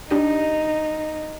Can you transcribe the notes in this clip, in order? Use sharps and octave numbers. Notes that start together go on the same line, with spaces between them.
D4 D#4 G4 D#5